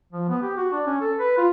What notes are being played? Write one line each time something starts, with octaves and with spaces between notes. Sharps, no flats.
F3
B3
G4
F#4
D4
C#4
A4
B4
F4